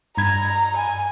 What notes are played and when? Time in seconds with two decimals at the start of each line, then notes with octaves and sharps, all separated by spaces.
0.17 G2 A#5 B5 G#6
0.78 G#5